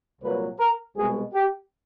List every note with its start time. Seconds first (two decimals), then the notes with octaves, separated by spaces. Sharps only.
0.21 C2 A#2 F#3 B4
0.59 A#4
0.96 C2 B2 G#3 G#4
1.33 G4